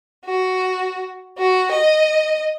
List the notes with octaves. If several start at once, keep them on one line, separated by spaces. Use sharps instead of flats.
F#4
F#4
D#5